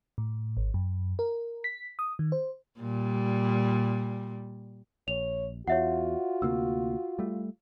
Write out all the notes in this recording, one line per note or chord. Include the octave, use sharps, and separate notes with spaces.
A2
G#1
F#2
A#4
B6
D#6
D#3
C5
A#2 G3
A#1 C#5 F7
E2 F4 F#4 C#5 E5 F#5
D2 C3 A#3 E6
G3 A3